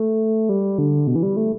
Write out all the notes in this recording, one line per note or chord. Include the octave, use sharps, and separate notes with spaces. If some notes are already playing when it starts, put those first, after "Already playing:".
Already playing: A3
G3
D3
B2
E3
G3
A3